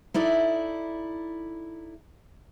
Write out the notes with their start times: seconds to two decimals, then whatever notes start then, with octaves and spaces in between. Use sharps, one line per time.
0.14 D#4 E4 A4 D5